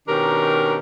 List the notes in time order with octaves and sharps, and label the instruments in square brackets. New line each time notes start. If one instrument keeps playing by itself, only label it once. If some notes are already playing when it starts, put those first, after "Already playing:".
[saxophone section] B2 D#3 C#4 D4 G4 A#4